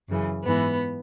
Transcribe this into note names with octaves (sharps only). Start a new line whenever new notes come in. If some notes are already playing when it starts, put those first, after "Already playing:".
F#2 C#3 E3
G#2 E3 B3